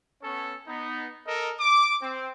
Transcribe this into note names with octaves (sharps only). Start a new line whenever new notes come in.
B3 C#4 A4 C#5
B3 D#4
A4 A#4 D#5
D6
C4